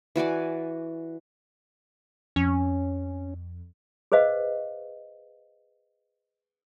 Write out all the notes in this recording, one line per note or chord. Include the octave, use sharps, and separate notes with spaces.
E3 F#4 D5 G#5
F2 C#4
G#4 B4 C5 D#5 F5